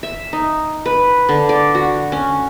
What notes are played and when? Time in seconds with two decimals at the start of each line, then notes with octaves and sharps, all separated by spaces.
0.03 E5
0.33 D#4
0.86 B4
1.29 D3
1.49 D5
1.75 F#4
2.12 C#4